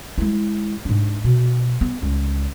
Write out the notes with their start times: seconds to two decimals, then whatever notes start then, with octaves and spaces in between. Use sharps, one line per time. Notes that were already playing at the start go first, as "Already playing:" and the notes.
0.18 G#3 E4
0.85 G#2 D4
1.24 B2
1.81 B3
2.02 C#2